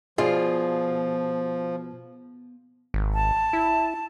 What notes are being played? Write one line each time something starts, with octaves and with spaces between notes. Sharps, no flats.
B2 F3 F4 G#4 D5 F5
G#1
A5
E4